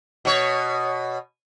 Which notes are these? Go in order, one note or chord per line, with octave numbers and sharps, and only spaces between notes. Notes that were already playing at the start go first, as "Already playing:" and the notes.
B2 C#5